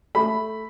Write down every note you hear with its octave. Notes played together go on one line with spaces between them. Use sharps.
A3 B5